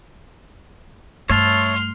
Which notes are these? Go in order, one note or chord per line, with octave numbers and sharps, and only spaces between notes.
G2 A3 C#5 E5 A5 C6 F6